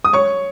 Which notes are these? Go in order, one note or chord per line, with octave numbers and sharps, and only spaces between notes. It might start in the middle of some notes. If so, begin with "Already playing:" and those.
D#6
C#5 C#6